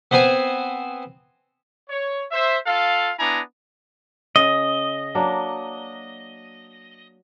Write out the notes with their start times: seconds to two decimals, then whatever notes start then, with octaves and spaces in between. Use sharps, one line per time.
0.11 B3 C4 C5 G#5
1.90 C#5
2.32 C5 E5
2.67 F4 A4 F5
3.19 B3 D4 E4 G#5 A#5
4.36 C#3 D#5
5.15 F#3 A#3 D4